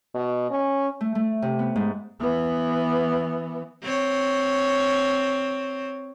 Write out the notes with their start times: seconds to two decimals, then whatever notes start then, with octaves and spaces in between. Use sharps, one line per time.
0.15 B2
0.50 C#4
1.01 A3
1.15 A3
1.42 C3
1.59 B3
1.76 G#2
2.20 E3 B3
3.83 C4 C#5